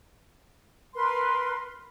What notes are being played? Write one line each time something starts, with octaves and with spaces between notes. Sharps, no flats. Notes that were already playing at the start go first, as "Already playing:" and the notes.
A#4 B4 C6